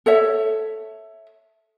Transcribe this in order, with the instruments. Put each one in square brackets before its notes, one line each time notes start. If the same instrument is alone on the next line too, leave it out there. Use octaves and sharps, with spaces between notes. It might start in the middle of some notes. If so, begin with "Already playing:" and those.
[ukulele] A4 C#5 E5